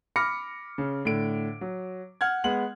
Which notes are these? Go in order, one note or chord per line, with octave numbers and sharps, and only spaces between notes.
B5 D6 F6 A#6 C#7
C#3
A2 D3 D7
F#3
F#5 F6 G#6
G#3 B3 F#5 F#7